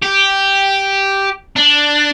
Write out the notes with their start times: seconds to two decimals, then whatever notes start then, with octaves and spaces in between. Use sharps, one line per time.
0.02 G4
1.56 D4